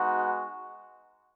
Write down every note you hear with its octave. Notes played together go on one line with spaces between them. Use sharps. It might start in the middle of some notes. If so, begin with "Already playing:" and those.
Already playing: G#3 B3 D#4 F#4